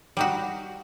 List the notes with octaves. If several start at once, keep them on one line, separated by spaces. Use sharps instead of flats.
G3 D#4 F#4